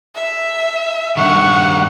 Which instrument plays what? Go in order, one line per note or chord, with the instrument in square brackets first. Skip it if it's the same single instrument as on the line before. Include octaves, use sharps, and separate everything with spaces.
[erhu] E5
[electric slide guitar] G2 D#3 [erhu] F#5 [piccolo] C#6